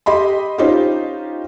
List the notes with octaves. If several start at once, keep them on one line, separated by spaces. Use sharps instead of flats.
G4 D#5 B5 C6
C#4 D#4 F4 G4 C5